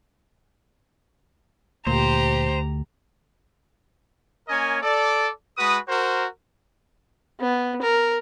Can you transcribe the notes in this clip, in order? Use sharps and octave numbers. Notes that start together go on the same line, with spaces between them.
D2 A#2 G4 C5 A#5
A#3 C#4 A#4 C#5 D#5 G#5
A4 D5
G#3 F#4 B4 B5 D#6
F#4 A#4 C5
B3
A#4